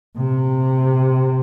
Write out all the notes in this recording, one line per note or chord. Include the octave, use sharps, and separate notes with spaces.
C3